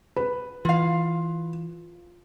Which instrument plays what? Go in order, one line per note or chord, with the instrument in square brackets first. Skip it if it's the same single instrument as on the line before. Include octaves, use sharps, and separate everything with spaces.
[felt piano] B4
[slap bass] E3 [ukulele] F4 F5